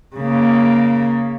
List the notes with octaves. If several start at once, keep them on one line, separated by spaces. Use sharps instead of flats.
C#3 A#3